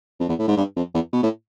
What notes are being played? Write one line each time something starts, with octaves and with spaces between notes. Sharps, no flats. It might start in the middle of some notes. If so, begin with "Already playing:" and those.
F2
E2
A2
G#2
G2
F2
E2
B2
A2